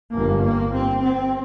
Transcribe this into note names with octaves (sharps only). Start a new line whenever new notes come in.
G1 G2 A#3
A#3
C4
C4